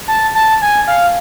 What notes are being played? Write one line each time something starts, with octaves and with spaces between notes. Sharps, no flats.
A5
A5
G#5
F5